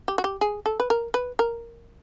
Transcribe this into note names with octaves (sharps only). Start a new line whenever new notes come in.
G4
F#4
G4
G#4
A4
B4
A#4
B4
A#4